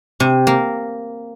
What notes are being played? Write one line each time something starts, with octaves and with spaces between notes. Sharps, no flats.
C3
A#3